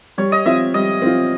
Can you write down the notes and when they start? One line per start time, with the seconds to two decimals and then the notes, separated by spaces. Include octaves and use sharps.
0.18 G3 C#5
0.32 D#5
0.46 C4 F4 E5
0.74 G3 D#5
1.02 C4 F4